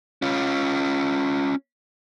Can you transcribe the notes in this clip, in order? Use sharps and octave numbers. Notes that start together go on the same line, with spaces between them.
C#4 F4